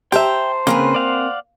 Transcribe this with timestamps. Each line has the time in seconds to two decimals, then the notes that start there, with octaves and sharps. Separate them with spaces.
0.12 G4 C5 E5 G5 A5 A#5
0.67 C#3 A#3 C4 A#4 B4 G#5
0.94 D5 F5 F#5